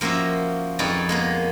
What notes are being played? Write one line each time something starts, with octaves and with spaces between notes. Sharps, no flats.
F3 A#3 C#4 F#4 E5
F2 D#4 G#4 B4 C#5 D5
G#3 A#3 B3